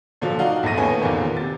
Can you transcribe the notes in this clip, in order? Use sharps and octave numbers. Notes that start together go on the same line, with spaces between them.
A#2 D3 F3 F#3
D#4 F#4 D5 F5 F#5
A#1 E2 A2 A#6 D#7
D#2 A2 B3 C#4 G#5
E2 A#2 D3 D#3 A#3 C5
C3 A6